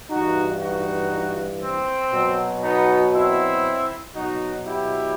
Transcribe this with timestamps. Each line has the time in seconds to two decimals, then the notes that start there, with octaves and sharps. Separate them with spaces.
0.10 G2 E3 D#4 F#4
0.61 D#4 F#4
1.62 C4
2.12 B2 F#3
2.63 B3 D#4
3.13 C4 E4
4.15 B2 F#3 D#4 F#4
4.65 E4 G4